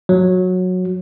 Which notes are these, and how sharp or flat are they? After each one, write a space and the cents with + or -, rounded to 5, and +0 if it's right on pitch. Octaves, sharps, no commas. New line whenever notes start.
F#3 -15